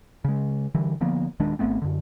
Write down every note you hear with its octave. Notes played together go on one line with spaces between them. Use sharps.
C#3 G#3
D3 E3 G3
D3 F3 A#3 B3
D#1 D#3 G#3 D4
G#1 A3 B3 C4
F#2 D3